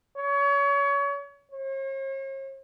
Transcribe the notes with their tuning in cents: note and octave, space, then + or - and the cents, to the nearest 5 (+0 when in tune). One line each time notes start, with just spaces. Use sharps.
C#5 +30
C#5 -45